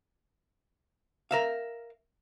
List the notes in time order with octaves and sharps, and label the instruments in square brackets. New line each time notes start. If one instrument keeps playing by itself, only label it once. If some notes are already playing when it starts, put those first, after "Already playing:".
[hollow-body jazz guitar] A#4 E5 F5